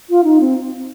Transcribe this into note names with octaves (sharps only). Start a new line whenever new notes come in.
F4
D#4
C4